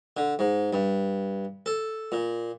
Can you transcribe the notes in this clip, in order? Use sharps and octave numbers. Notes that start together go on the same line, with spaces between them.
D3
G#2
G2
A4
A#2